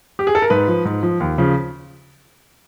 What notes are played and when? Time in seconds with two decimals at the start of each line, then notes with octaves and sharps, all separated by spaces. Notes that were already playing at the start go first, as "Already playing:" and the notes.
0.19 G4
0.27 G#4
0.35 A4
0.42 A#4
0.50 G#2 B4
0.68 F3
0.85 G#2
1.03 F3
1.20 D#2
1.38 C#3 F3